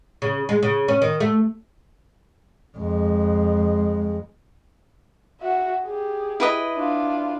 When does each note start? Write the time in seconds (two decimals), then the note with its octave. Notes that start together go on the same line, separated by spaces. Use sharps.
0.22 C#3
0.49 G#3
0.63 C#3
0.88 C#4
1.02 D#3
1.20 A3
2.77 F2 G#3
5.40 F#4 E5
5.85 G4 G#4
6.40 E4 B4 D#5
6.75 D4 F4